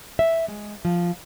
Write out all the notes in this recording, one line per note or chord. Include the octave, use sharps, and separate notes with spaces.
E5
G#3
F3